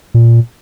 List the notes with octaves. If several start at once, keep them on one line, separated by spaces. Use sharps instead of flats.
A#2